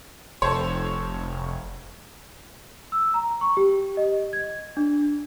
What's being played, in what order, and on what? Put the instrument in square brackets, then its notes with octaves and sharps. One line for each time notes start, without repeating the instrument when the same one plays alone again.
[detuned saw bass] F1 [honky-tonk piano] A4 C5 C#5
[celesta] E6
A#5
C#6
G4
D#5
G#6
D4